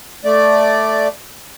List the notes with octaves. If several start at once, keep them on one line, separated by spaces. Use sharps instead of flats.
A3 D5